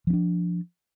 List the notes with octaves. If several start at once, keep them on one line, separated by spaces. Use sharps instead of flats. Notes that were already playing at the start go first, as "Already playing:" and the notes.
F3 C#4 D4